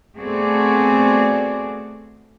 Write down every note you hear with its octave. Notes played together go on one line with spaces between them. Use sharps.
A3 B3 C4 F#4 G#4 D5